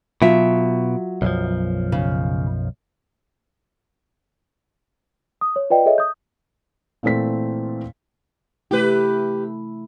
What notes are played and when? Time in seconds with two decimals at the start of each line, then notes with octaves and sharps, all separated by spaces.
0.22 B2 F#3 F4 E5
1.22 B1 F#2 F3
1.92 C#3
5.41 D#6
5.56 C#5
5.70 F4 B4 D5 D#5 G5
5.86 G#4 A4 C#5 D#5 E5
5.98 D#6 G6
7.03 A#2 E3 A3 C4 B6
8.71 C3 A3 E4 G4 B4